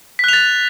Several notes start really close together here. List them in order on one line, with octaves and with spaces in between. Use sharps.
B6 F#6 F7 A6